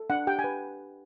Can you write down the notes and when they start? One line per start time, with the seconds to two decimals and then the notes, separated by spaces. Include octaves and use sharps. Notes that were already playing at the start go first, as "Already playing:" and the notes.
Already playing: A4
0.10 D4 F#5
0.27 G4 G5
0.39 G#5
0.44 B4